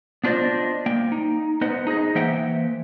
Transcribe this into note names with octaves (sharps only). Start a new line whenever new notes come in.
B3 D4 F4 C5 D5 D#5
A#3 G5
D#4
B3 B4 C5 D#5 F#5
D#4 G#4 C5 D#5
E3 A#3 C5 E5 F#5 G5